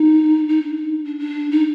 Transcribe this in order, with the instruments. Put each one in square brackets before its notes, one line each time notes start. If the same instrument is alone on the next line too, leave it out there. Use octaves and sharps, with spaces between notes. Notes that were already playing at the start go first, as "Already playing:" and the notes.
Already playing: [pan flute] D#4
D#4
D4
D#4
D4
D4
D#4